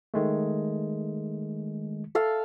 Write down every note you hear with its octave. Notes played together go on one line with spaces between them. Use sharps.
D#3 G#3 A3
A4 E5 F5